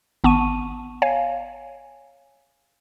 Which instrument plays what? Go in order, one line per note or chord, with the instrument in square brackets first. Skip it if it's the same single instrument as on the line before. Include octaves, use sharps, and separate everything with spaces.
[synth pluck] G#1 B3 A5 C#6 D#7
C#5 F5 G#5